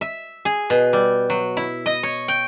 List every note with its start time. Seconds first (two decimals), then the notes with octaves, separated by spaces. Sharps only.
0.01 E5
0.45 G#4
0.70 B2
0.93 G3
1.30 F#3
1.57 E4
1.86 D#5
2.03 C#5
2.28 G5